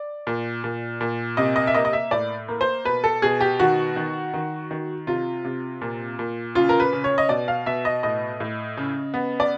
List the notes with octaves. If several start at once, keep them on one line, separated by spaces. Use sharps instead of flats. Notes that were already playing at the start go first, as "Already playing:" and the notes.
Already playing: D5
A#2
A#2
A#2
C3 D#5
D#5
E5
A#3 D#5
D#5
E5
A2 D5
A#3
C5
B2 B4
A4
B2 G#4
G4
D#3 F#4
D#3
D#3
D#3
C3 F4
C3
A#2
A#2
C#3 F4
A#4
B4
C#3
C#5
D#5
B2 D5
F5
B2 E5
D#5
A2 D#5
A2
C#3
B3
D5